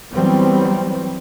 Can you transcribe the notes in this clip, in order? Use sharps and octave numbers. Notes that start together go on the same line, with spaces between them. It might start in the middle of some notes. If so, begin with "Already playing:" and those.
E3 F#3 G3 B3 C4